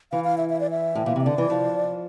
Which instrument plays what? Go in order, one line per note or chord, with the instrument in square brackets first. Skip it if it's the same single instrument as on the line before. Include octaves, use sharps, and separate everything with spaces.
[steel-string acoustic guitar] E3 [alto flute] F5
[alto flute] F5
E5
E5
D5
E5
[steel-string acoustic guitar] A2
A#2
[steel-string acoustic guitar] C3 [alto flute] E5
[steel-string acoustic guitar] D3 [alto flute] D5
[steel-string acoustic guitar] E3
F3